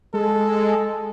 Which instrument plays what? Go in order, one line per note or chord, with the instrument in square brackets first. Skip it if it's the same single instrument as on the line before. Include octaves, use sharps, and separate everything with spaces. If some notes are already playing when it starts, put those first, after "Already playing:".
[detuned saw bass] G#3 [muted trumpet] A4